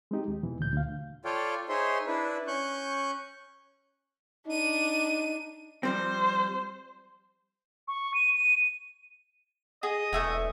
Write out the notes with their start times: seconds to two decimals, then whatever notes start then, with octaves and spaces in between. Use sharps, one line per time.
0.11 G#3 C4 D#4 G4
0.28 D#2
0.43 E2 B2 E3
0.59 D2 A#2 G6
0.73 D2 F5
1.25 F4 A4 C#5 D5 F5 G5
1.69 D#4 G#4 C5 C#5 E5 C6
2.07 D4 E4 B4
2.47 C#4 C#6 F#6 G6
4.47 D4 D#4 D#7
5.83 F3 G3 C4 C5
7.88 C#6
8.14 D#7
8.34 D#7
9.83 G#4 D#5 D#6
10.13 E1 A3 E5 G#5